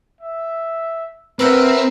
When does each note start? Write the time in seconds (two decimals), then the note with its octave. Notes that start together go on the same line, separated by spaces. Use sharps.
0.21 E5
1.39 C4 A#4 B4 E5 F#5